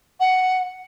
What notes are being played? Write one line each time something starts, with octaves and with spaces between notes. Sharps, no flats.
F#5